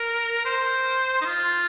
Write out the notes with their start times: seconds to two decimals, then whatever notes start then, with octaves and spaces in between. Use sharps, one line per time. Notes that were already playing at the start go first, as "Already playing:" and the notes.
Already playing: A#4
0.45 C5
1.21 D#4
1.25 F4